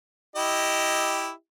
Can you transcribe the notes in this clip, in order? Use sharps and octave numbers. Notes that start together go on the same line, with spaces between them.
E4 G4 D#5